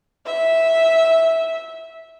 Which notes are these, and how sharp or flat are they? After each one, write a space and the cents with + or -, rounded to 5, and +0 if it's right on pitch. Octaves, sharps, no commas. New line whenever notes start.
E5 -10